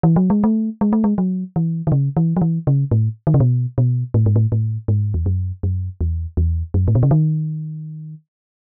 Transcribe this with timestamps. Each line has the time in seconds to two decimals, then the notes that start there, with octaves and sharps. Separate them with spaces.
0.03 E3
0.16 F#3
0.30 G#3
0.44 A3
0.81 G#3
0.93 A3
1.04 G#3
1.18 F#3
1.56 E3
1.87 D#3
1.92 C#3
2.17 E3
2.37 F#3
2.42 E3
2.67 C#3
2.91 A2
3.27 D#3
3.34 C#3
3.40 B2
3.78 B2
4.14 A2
4.26 G#2
4.36 A2
4.52 A2
4.88 G#2
5.14 E2
5.26 F#2
5.63 F#2
6.01 E2
6.37 E2
6.74 F#2
6.88 A2
6.95 B2
7.03 C#3
7.11 D#3